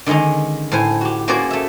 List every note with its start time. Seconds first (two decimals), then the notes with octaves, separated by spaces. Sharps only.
0.06 D3 D#3 G#3 C#4 D#4
0.72 A2 C5 G#5
1.01 F#4 G4
1.28 A#3 C#4 F#4 G#4 C5 D5
1.50 A3 E5